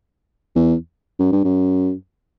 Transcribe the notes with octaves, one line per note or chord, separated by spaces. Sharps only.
E2
F#2
G2
F#2